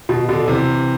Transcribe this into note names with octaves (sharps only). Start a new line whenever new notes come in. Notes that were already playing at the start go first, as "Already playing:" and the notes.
B2
B2 D3
C3 E3